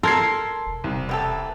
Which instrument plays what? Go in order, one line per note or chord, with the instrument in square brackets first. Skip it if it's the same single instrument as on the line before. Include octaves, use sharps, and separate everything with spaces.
[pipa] A4 [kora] A#4 [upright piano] C6 G#6 C7
[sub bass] E1
[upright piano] C2
[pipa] E3 G4 A4